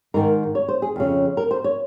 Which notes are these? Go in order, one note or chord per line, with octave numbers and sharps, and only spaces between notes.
G#2 D#3 A#4
C#5
C5
G#4
F2 C#3
A#4
C5
C#5